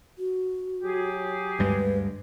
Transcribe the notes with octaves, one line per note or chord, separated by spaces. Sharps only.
F#4
F#3 G4 G#4
D2 G2 G#3 B4